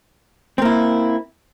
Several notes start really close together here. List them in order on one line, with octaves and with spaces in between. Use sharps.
C4 A#3 E4